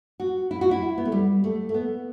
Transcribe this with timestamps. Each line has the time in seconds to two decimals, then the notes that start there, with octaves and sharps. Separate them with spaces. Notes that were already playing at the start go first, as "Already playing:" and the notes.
0.20 F#4
0.51 E4
0.61 F#4
0.71 E4
0.98 B3
1.05 A3
1.12 G3
1.44 A3
1.69 A3
1.74 B3